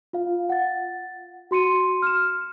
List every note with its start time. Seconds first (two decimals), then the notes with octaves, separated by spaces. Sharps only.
0.13 F4 F5
0.49 F#5 A6
1.51 F#4 C6 C#7 D#7
2.02 F6 E7